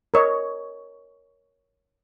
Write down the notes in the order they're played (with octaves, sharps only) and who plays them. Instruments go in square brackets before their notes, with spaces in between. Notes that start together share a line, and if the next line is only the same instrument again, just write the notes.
[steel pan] A#4 C#5 D#5